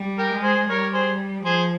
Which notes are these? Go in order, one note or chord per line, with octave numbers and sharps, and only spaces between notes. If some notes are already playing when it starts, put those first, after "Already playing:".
Already playing: G3
G4 A#4
G#3
G#4 C5
G3 A#4 C#5
G#4 C5
F3 G#4 C5